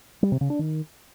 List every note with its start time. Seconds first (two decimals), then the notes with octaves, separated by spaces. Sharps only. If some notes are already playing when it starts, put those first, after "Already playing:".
0.23 G3
0.32 C3
0.41 C#3
0.50 D4
0.59 D#3